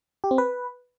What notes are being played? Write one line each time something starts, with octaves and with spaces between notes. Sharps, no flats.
G4
C4
B4